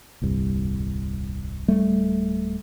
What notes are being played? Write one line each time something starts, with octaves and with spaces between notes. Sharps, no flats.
D#1 C2 G2
D1 G3 A3